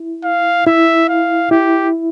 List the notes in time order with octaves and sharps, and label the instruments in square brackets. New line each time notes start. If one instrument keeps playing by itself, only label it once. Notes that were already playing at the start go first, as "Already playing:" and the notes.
Already playing: [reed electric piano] E4
[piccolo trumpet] F5
[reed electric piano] E4 [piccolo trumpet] E5
[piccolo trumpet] F5
[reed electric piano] E4 [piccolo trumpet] G4